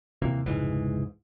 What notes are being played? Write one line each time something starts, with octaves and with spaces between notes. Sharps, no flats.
D#2 C3 E3 A#3
F1 C#2 G#2 E3